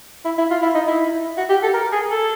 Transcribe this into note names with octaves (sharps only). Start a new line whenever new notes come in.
E4
E4
F4
E4
D#4
E4
F#4
G4
A4
A#4
G#4
A4